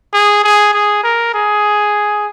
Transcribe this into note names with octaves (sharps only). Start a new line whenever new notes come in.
G#4
G#4
G#4
A#4
G#4